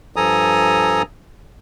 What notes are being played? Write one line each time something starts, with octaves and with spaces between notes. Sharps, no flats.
G2 F3 A4 G#5 A#5 D#6